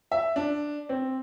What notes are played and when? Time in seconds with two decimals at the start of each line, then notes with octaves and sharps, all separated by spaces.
0.11 E5
0.36 D4
0.89 C4